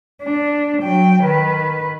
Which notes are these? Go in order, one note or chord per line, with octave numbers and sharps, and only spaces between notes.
D4
F#3 G5
D#3 B4